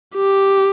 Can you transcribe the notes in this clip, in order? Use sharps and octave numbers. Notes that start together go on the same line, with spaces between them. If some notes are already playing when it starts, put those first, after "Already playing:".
G4